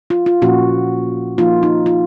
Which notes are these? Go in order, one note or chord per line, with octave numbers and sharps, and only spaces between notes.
F4
F4
A#2 F3 A#3 C#4 F#4
F3 A#3 D#4 F4
D#4
F4